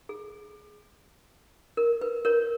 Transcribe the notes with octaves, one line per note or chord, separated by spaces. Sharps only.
G#4
A#4
B4
A#4 C#5